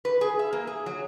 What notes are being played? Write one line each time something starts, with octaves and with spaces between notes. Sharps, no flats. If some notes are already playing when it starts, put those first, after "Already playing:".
B4
G#4
E5
A#3
G#4
F#3